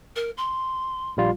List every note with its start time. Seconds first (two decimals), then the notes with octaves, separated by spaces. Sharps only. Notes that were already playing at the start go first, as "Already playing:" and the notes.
0.16 A#4
0.37 C6
1.17 A#1 G3 F4